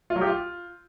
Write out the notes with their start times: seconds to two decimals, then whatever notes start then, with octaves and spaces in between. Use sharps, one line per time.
0.10 F4
0.16 F#3
0.21 G4
0.27 F4